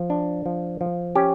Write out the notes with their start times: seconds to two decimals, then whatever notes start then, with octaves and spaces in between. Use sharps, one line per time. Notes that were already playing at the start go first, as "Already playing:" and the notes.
Already playing: F3
0.10 D4
0.46 F3
0.81 F3
1.15 C#4 G4